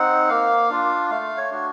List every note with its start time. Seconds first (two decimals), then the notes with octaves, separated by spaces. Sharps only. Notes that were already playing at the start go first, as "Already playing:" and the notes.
Already playing: C4 D#4 F#5
0.29 A#3 F5
0.70 D4 F4
1.10 A3 F5
1.37 C#5
1.51 D4 F#4